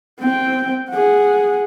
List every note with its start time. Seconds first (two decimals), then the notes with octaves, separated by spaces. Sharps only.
0.19 C4 G5
0.90 G#4 F#5